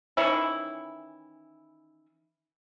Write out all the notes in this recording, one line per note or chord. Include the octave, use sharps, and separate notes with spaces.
D#3 E3 C#4 E4